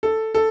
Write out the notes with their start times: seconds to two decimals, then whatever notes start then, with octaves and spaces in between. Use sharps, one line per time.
0.03 A4
0.35 A4